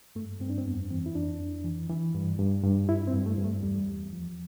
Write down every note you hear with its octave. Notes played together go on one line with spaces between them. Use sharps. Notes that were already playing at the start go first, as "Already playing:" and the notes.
G2 A3
G2 C4
D4
C4
F2 B3
E3 C4
E4
F2 D4
F2
E3
E3
G2
G2
G2
G2 E4
C4
G2
A3
G2
A3
E2 G3
E2
F3